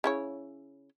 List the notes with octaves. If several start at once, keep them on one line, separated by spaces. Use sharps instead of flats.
C#3 E4 C#5